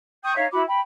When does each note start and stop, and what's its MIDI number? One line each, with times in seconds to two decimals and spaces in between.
0.23 0.34 79
0.23 0.34 85
0.23 0.34 87
0.23 0.34 91
0.35 0.45 63
0.35 0.45 73
0.35 0.45 76
0.35 0.45 77
0.52 0.62 64
0.52 0.62 66
0.52 0.62 83
0.52 0.62 86
0.67 0.81 79
0.67 0.81 83